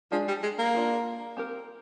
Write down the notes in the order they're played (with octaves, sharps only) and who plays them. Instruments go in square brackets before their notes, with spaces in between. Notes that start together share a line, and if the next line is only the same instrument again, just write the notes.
[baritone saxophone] F3 [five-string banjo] G#3 D4 G#4
[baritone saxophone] G3
G#3
A#3
[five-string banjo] D4 F4 A#4
C4 G4 A#4